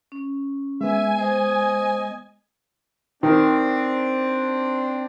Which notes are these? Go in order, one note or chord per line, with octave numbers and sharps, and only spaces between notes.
C#4
G#3 B3 E5 G#5
C5 D#5
D#3 C4 D4